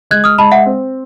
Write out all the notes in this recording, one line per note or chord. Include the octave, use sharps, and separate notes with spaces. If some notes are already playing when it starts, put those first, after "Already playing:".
G#3 F#6 G#6
D#6 F6
G#3 A5 B5
E5 F#5
C4